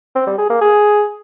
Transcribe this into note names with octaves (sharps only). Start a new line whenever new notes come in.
C4
G3
G#4
A#3
G#4